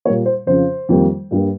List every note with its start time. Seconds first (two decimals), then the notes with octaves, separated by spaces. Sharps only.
0.05 A#2 G3 A#3 C#5
0.26 C5
0.46 F2 C#3 F3 C5
0.89 F2 D#3 G3 A#3
1.31 G2 G3 A#3